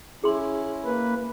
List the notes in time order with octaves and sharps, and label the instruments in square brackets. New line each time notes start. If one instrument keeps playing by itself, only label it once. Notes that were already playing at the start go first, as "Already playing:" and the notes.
[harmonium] C#4 E4 [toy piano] G#4 C6
[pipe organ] A#3 B4